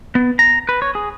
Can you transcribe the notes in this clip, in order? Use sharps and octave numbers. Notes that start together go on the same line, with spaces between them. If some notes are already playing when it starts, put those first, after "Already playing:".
B3
A#5
B4
C#5
G#4